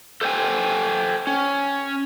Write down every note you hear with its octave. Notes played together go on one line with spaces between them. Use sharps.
A4 C5 C#5 G5 G#5
C#4